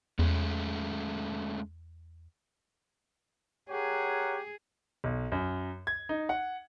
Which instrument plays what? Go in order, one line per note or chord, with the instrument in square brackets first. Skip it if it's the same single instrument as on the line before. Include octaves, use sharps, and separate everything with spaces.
[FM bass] E2 [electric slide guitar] G#3 A3 C#4
[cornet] G4 [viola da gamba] G#4 [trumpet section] A#4 C#5 F#5
[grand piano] B1
F#2
G#6
D#4
F#5